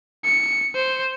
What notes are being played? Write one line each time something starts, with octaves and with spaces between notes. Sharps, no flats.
C#7
C5